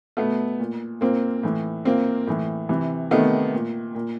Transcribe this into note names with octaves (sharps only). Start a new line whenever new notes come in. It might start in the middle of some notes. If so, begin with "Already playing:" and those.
B2 A3 B3
A#2
A#2 A#3 C4
A2 E3
A#2 A#3 C4
A2 E3
C3 E3
C3 D#3 A3 B3
A#2
A#2